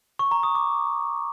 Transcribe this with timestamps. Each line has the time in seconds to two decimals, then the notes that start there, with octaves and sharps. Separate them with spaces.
0.19 C#6
0.31 A#5
0.43 D#6
0.55 D6